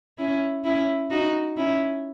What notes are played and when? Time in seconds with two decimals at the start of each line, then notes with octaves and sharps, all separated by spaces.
0.18 C#4 E4
0.64 C#4 E4
1.11 D#4 F#4
1.57 C#4 E4